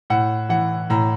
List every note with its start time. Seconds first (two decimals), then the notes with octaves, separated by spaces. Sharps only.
0.10 A2 F#5
0.49 E3 F#5
0.90 A2 A#5